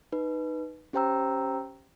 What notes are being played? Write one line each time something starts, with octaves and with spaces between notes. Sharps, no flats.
D#4 B4
C#4 G4 C5 G5 A#5 E6